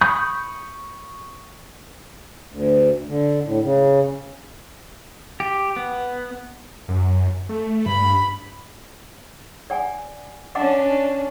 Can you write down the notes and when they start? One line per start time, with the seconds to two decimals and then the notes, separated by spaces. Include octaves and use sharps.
0.01 B5 C#6 D#6 G6
2.50 D2
3.07 D3
3.44 A2
3.63 C#3
5.40 G4
5.76 B3
6.89 F#2
7.49 A3
7.86 G2 B5
9.70 D5 F#5 G#5
10.55 C#4 D4 D#5 F#5 D6